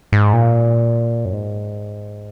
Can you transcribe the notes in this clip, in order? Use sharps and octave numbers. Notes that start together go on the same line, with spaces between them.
G#2
A#2
F#2
G#2